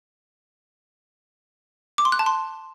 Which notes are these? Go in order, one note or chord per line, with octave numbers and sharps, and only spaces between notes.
D6
C6
F#6
A5
C6